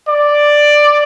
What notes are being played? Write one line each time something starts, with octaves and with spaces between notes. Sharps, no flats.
D5